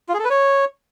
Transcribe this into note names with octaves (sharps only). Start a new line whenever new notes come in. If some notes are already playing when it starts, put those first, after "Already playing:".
F4
G#4
A4
B4
C#5